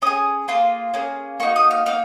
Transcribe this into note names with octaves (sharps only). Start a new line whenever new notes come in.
C#4 G#4 D#6
A#3 F4 G#4 C6
A#3 C#4 G#4
A#3 D#4 F#4 C#6
D#6
F6
A#3 D#4 F6